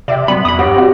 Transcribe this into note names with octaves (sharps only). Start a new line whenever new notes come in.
C3 D5 E5 G5
F#2 B3 B5
E2 B5 D#6
G2 G4 C#5 F#5 A#6
C4 F#4 D5